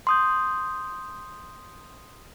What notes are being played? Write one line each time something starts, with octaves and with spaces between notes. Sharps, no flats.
C6 D#6 G6